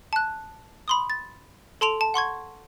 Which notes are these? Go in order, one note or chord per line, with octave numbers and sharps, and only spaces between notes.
A5 F#6
B5 C6 D#6
A6
A4 A5 C6 D7 F7
A5
F#5 C6 C#6 G#6